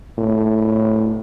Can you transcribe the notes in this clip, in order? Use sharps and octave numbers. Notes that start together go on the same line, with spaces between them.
A2